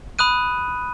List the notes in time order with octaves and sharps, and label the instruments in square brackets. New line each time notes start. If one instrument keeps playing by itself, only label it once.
[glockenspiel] B5 D#6 F#6 D#7